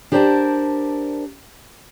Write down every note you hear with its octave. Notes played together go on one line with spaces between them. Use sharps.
D4 G4 A#4 C5 D5 A5